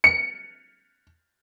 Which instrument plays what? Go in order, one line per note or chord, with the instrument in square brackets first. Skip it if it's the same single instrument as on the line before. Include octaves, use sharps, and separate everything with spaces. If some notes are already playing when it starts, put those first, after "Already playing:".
[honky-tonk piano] C#7